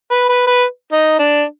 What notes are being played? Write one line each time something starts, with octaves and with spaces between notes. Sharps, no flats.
B4
B4
B4
D#4
D4